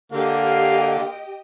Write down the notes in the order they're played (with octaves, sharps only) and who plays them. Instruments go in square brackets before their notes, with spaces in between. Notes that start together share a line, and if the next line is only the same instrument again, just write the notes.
[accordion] D3 [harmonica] A#3 [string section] G4 D#5 G5 [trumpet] F5